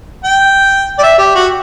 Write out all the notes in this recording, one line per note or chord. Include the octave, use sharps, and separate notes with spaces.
G5
D5
E5
G4
F#4